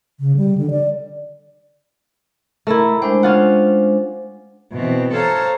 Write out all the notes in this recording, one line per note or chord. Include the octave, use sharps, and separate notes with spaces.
C#3
G3
D3
D5
A3 E4 A#4 E5 A#5
G#3 D4 C5 G5
C#4 F4 F#5
B2 E3 C4
A4 C5 C#5 F5 A5 A#5